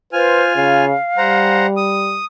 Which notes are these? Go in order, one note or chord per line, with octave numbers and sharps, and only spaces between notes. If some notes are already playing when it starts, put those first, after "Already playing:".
F4 B4 C5 G#5 F6
C#3 F5
G3 C5 F#5 A#5
D#6